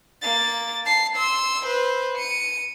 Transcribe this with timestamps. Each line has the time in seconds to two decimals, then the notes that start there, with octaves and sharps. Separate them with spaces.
0.22 A#3 A6
0.86 A5 C7
1.16 C6 E6
1.66 B4 C5
2.18 C#7 D#7